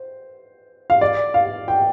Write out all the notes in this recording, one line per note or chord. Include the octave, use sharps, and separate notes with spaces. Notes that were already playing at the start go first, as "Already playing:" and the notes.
Already playing: C5
F5
D5
F5
G5